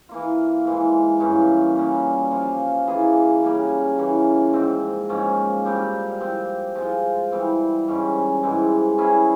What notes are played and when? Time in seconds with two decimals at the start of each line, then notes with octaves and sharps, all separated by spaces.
0.09 E3 A#3 F4
0.64 G#2 E3 G#3
1.20 G2 E3 A#3 C#4
1.76 A#2 G3 A#3 C#4
2.31 F3 A#3 F4
2.87 E3 A#3 F4 G#4
3.43 C#3 G3 A#3
3.98 C#3 E3 A#3
4.53 G#2 F3 C4
5.09 G#2 F3 A#3 C#4
5.65 A#2 G3 C4 G4
6.21 F3 C4 G4
6.75 F3 G#3 C4 F4
7.32 E3 G3 C4
7.88 G#2 G3 C#4
8.43 G#2 E3 G#3 C4
8.98 G3 C#4 E4 G#4